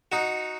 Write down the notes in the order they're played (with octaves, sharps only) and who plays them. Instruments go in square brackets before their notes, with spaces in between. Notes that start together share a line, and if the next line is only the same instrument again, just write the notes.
[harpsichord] D#4 F#4